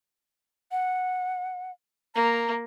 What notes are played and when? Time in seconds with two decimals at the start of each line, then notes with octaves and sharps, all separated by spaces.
0.72 F#5
2.15 A#3 A#5